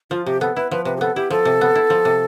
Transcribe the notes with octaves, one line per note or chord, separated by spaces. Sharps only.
F3 F4
C3 G4
B3 A4
E4 B4
F3 B4
C3 B4
G4
B3 A4
E4 G4
F3 A4
C3
B3
E4
F3
C3